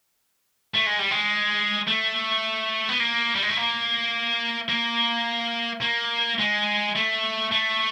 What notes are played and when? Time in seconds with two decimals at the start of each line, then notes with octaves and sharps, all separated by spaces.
0.74 A3
0.86 G#3
0.99 G3
1.11 G#3
1.88 A3
2.89 B3
3.00 A#3
3.35 G3
3.42 G#3
3.49 A3
3.57 A#3
4.69 A#3
5.82 A#3
6.39 G#3
6.95 A3
7.52 A3